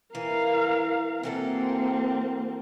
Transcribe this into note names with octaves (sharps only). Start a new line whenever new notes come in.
E3 A#4 F5
E3 A#3 C4 F#4 A4